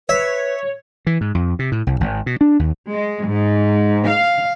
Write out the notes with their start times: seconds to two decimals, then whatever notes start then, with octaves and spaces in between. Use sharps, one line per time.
0.09 B4 C#5 E5
1.07 E3
1.21 G#2
1.35 F2
1.59 C3
1.72 A2
1.87 C2
2.00 G#1
2.26 B2
2.41 D4
2.59 D#2
2.92 G#3
3.27 G#2
4.09 F5